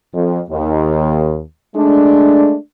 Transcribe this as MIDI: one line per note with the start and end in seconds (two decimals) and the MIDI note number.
0.14 0.40 41
0.50 1.40 39
1.75 2.55 56
1.75 2.55 57
1.75 2.55 62